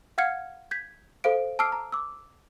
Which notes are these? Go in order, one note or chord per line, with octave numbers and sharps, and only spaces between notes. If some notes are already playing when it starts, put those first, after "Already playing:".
F5 F#5 F6 G#6 C#7
G6 G#6 B6
A4 C5 F5 D7
A5 D6 E6 F6 C7 D7
A#5
D6 E6